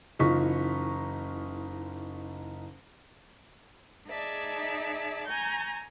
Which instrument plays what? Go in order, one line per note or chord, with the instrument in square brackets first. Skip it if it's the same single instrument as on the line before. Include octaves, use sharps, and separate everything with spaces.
[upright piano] F#1 E3 D#4 F4 C#6 B6
[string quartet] D#4 G#4 D5 E5 A5
G#5 A#5 C#6 G6